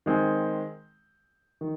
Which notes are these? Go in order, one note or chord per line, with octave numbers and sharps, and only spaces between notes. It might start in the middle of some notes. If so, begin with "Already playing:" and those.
D#3 G#3 C4
D#3